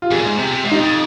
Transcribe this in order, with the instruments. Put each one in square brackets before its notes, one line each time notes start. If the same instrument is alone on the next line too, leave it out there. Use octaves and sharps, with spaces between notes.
[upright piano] F4
[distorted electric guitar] F2 [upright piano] G#4
[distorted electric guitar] A#2
G#2
C3
C3
G#2
[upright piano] D#4
[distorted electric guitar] F2